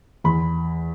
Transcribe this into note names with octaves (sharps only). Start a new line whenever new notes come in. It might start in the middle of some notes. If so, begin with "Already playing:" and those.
E2 B5